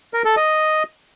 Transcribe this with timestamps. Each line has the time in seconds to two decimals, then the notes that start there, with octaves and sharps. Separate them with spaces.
0.14 A#4
0.25 A4
0.36 D#5